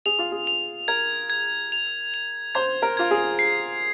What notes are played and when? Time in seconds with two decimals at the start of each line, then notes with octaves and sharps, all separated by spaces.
0.06 G#4 F7
0.19 F4
0.32 G#4
0.47 F7
0.88 A#4 G#6
1.30 G#6
1.72 F7
2.14 F7
2.55 C5 G#6
2.82 A#4
2.97 F4 G#6
3.11 G#4
3.39 C7